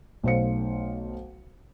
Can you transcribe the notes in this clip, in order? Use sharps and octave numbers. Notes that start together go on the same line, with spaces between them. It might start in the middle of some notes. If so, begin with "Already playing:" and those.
B1 A3 C5 F5 C#7